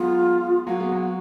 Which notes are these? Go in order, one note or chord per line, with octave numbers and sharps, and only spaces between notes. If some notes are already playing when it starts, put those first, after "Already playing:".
Already playing: F#3 G#3 A#3 B3 F4
F#3 A#3 F#4
G#3 B3
F#3 A#3